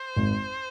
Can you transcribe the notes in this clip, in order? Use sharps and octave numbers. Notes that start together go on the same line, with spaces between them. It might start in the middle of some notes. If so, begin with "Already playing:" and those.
Already playing: C5
G#1